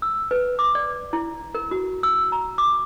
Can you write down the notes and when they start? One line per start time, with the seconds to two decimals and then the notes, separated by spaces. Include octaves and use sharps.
0.02 E6
0.31 B4
0.59 D6
0.75 D5
1.13 E4
1.55 A#4
1.71 F#4
2.03 E6
2.32 A#5
2.58 D6